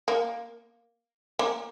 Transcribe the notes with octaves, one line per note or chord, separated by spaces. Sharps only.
A#3
A#3